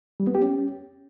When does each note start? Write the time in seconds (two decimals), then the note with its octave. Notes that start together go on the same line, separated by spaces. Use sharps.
0.20 G3
0.27 B3
0.35 G4
0.42 C#4